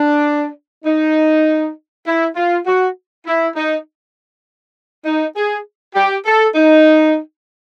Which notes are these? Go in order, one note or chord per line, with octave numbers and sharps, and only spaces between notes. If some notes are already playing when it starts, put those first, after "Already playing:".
Already playing: D4
D#4
E4
F4
F#4
E4
D#4
D#4
G#4
G4
A4
D#4